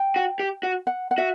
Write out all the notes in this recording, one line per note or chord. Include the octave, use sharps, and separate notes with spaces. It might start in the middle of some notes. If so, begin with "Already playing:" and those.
Already playing: G5
F#4
G4
F#4
F#5
F#5
F#4 E5